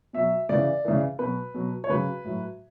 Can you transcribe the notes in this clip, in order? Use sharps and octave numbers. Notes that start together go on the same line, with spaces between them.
B2 F#3 E5
C#3 E3 D5
C#3 E3
B2 F#3 B4
B2 F#3
C#5
C#3 F#3 B4
A2 F#3